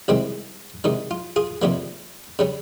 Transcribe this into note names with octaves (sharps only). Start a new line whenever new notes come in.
C2 C3 D#3 G#3 C4
C3 D#3 G#3 D#4
F4
F4 G#4
F2 C3 D#3 G3 A#3
C#3 G3 C#4